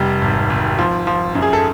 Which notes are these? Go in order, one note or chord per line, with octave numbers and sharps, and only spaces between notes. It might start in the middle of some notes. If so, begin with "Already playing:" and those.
Already playing: F1 G3
G#1
G#1
F3
F3
F#2
G#4
A4